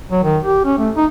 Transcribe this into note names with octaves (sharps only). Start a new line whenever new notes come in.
F#3
D#3
G4
C#4
A3
D#4